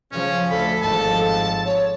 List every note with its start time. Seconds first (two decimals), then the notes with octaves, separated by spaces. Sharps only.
0.12 C#3 F3 C#4
0.50 D2 A4 B5
0.82 G#1 F3 A5
1.65 C#5